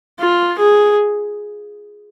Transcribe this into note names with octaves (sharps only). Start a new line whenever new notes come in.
F4
G#4